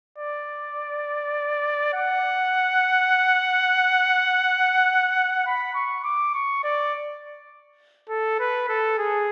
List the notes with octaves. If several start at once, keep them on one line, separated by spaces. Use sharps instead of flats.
D5
F#5
B5
C#6
D6
C#6
D5
A4
B4
A4
G#4